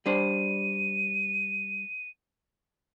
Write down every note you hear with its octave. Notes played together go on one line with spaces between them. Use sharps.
G3 D4 C5 D#7